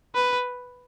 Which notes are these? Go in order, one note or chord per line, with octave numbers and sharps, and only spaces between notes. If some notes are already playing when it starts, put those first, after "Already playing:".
B4